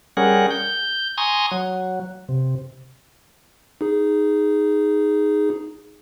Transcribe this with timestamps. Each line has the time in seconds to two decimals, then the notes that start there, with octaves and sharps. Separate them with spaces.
0.17 G3 C#4 G#4 A#4 F#5
0.51 G6
1.18 G#5 A#5 C6 C#6 D#6
1.51 F#3
2.29 C3
3.81 D#4 G#4